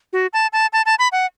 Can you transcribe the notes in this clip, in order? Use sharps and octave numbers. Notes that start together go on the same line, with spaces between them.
F#4
A5
A5
A5
A5
B5
F#5